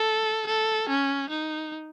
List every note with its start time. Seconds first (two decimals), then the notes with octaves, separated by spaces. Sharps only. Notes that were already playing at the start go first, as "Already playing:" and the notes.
Already playing: A4
0.47 A4
0.89 C#4
1.30 D#4